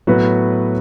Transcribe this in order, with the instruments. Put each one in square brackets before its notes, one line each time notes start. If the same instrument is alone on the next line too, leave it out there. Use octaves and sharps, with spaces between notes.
[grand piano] A2 F#3 B3 F#4 B4